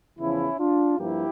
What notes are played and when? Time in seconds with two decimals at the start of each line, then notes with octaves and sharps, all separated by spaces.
0.19 E2 C#3 F3 C#4 E4
0.59 D4 F4
0.98 G2 F3 A#3 E4 G4